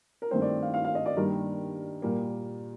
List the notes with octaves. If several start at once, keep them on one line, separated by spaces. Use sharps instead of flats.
A#4
G2 D#3 A3 C4 C5
D5
F5
F5
F5
D#5
D5
G2 D#3 G3 A#3 A#4
A#2 G3 A#3